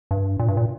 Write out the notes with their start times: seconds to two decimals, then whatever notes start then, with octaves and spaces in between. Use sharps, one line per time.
0.11 G2
0.39 A#2
0.48 G2
0.57 A#2